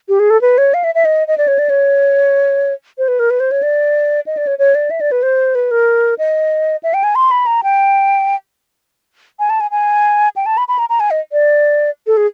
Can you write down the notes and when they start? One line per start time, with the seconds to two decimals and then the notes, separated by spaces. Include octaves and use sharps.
0.09 G4
0.19 G#4
0.30 A4
0.41 B4
0.58 C#5
0.74 F5
0.84 E5
0.95 E5
1.05 D#5
1.28 D#5
1.38 D5
1.48 C#5
1.59 D5
1.70 C#5
2.98 C5
3.08 B4
3.19 A#4
3.30 B4
3.40 C5
3.51 C#5
3.63 D5
4.27 D#5
4.37 D5
4.47 C#5
4.59 C#5
4.75 D5
4.91 E5
5.01 D5
5.12 B4
5.23 C5
5.55 B4
5.71 A#4
6.19 D#5
6.83 E5
6.94 G5
7.04 G#5
7.15 C6
7.31 B5
7.46 A#5
7.63 G5
9.39 G#5
9.50 A5
9.60 G#5
9.71 G#5
10.36 G5
10.46 A5
10.58 B5
10.68 B5
10.79 A#5
10.89 A#5
11.00 G#5
11.11 D#5
11.32 D5
12.07 A4
12.17 G#4